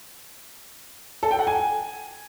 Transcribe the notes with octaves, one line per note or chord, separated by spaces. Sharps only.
A4
G5
F#5
G#5